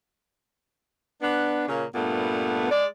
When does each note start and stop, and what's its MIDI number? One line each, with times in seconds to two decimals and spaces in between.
1.22 1.67 59
1.22 1.67 62
1.68 1.85 46
1.68 1.85 49
1.68 1.85 58
1.68 1.85 61
1.95 2.71 43
1.95 2.71 46
1.95 2.71 57
1.95 2.71 59
2.71 2.85 56
2.71 2.85 74